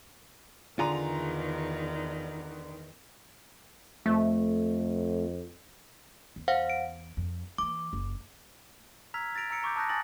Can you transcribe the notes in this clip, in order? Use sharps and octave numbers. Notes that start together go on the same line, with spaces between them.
E2 D3 D#3 F4 G#4 A#5 F7
F2 A3
E2
C5 F5 F#5
D7
F2
E3 A#3 D6
F#1
A#5 E6 F6 G#6 B6 F7
A6 A#6 D7 F7
A#5 E6 C#7 D7
A#5 C#6 D6 G6
A5 D#6 F#6 G6 A#6
G#5 D#6 A6 A#6 F#7